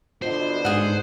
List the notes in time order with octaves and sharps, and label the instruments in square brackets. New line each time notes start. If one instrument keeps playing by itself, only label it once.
[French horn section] B2 D3 [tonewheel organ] F4 D#5 [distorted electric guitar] C5
[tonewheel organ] G#2 G#3 D#4 [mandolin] G#4 F#5